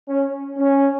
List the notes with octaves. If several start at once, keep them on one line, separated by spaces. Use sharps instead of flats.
C#4
C#4